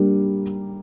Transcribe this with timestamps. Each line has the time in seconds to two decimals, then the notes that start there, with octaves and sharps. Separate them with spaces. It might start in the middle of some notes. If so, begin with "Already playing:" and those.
Already playing: G3 A#3 D4